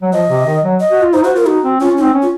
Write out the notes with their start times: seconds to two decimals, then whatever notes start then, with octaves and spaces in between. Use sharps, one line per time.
0.02 F#3
0.13 F3 D#5
0.30 C3
0.46 D#3
0.64 F#3
0.80 D#5
0.91 F#4
1.02 F4
1.13 D#4 C5
1.24 F#4 C5
1.36 F4 A#4
1.47 D#4 F#4
1.64 C4
1.80 C#4 F4
1.92 C#4
1.97 C4 D#4
2.14 C#4
2.22 F4